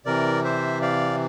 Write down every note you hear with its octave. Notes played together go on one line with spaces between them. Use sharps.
C3 E3 A#4 D5
C5 E5
D5 F5